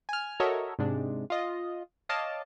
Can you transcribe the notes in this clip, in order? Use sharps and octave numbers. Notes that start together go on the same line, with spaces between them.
G#5 F6
F#4 A4 A#4 C#5 D#5 E5
G#2 C3 G#3 D4
F4 D#5
C#5 D#5 F5 A5 D6